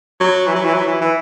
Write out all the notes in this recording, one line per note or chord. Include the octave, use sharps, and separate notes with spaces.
F#3
E3
F#3
E3
F#3
E3
E3